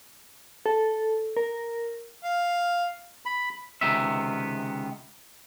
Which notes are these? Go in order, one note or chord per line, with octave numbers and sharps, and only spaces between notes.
A4
A#4
F5
B5
C#2 C3 D#3 B3 E5